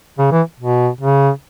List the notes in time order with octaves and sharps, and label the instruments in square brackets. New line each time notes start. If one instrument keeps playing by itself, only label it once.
[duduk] C#3
E3
B2
C#3